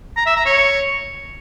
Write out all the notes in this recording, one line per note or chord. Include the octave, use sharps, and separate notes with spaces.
A#5
E5
A#5
C#5